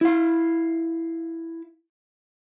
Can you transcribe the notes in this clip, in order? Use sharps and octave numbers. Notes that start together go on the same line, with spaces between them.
E4 F5